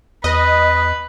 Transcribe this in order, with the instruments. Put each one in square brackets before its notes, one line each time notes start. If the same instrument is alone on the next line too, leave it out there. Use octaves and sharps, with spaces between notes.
[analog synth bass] E2 [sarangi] B4 [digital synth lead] D#5